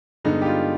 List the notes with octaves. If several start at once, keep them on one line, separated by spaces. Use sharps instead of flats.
G2 D3 G#3 B3 D#4
G4
F4